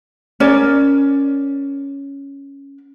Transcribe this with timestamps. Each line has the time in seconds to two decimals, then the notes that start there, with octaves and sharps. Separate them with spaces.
0.40 C#4 A#4 D5